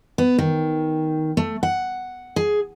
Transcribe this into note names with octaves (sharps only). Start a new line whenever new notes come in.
B3
D#3
A3
F#5
G#4